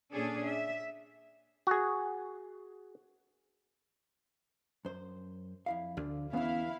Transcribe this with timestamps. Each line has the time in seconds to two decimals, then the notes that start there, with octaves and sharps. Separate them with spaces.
0.12 A#2 C#4 D4 G#4 A4
0.45 E5
1.67 F#4 G#4
4.85 F#2 C5
5.66 F2 E4 F5
5.97 D2 D3
6.33 E2 E3 B3 C#4 E4 F5